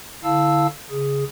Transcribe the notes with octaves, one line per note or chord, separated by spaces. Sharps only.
D3 E4 F5 A5 E6
C#3 G#4